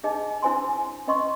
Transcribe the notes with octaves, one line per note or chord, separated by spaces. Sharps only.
D4 D#4 G#4 D#5
D4 E4 C5 G#5 C6
C#4 D#5 C6 C#6